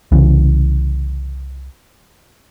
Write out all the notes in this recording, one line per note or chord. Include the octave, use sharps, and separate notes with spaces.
C2 C#3 E3